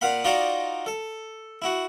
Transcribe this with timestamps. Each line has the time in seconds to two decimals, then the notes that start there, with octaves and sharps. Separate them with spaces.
0.01 A#2 F5 F#5 B5
0.24 D#4 F4 F#4 D5 F5 A#5
0.86 A4
1.62 E4 F#4